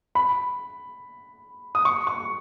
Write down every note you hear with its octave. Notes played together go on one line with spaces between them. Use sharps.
B5
D#6
C#6
C#6